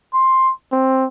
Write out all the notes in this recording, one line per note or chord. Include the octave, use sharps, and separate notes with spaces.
C6
C4